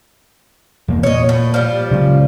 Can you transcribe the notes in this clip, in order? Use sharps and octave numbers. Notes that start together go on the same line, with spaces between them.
E2 A#3
A#2 C#5 D#5
A2
F3 G3
C#3 F#3 G#3